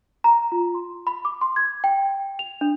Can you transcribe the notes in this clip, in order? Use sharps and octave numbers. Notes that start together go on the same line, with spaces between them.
A#5
F4
C6
B5
D6
C6
G#6
G5
F7
D4